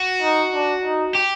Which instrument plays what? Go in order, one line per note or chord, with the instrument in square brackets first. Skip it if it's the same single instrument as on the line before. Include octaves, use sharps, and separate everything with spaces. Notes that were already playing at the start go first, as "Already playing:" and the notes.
Already playing: [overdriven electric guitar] F#4
[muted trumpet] D#4
D4
D#4
[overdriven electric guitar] G4